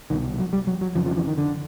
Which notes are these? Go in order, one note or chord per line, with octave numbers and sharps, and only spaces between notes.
C2 B2 D#3
F#3
G3
F#3
F#3
F2 C#3 F3
F3
E3
D#3
D3